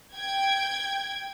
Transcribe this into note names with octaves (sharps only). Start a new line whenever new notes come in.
G5 G#6